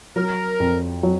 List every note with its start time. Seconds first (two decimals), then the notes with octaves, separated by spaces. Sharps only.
0.16 F#3 A#4
0.60 F2
1.03 F#3